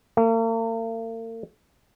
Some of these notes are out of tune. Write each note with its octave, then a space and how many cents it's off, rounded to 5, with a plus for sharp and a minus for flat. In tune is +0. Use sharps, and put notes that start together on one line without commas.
A#3 -45